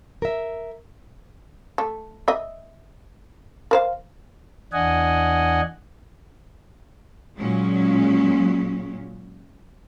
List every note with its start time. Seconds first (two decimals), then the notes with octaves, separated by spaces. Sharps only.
0.22 A#4 E5
1.78 A3
2.28 D#5 E5
3.71 A#4 C5 F5
4.73 E2 D4 D#5 F#5 G#5
7.38 A#2 F#3 G#3 C#4